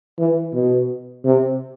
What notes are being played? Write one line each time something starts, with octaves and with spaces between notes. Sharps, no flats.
E3
B2
C3